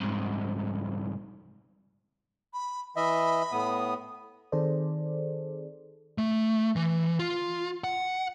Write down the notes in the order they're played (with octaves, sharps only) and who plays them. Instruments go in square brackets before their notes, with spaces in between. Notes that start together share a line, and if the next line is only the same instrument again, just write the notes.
[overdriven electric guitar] C2 G#2
[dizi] B5
[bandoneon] E3 D#5 E5 [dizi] B5
[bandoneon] A2 B3 D#6
[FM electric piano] D#3 C4 G#4 A4 C5 D5
[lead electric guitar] A3
E3
F4
F#5